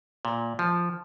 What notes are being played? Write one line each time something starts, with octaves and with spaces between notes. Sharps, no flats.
A#2
F3